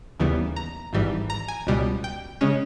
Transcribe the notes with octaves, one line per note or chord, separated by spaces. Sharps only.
D#2 C#3 E3 G3 B3
A#5
G#1 G#2 E3 G3
A#5
G#5
C#2 B2 G3
G5
C#3 G#3 C#4